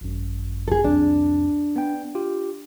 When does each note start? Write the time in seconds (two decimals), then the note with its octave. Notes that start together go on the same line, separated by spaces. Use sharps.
0.01 G#1 F#2
0.68 G#4 A4
0.84 C2 F2 D4
1.76 B3 G5
2.15 F4 G4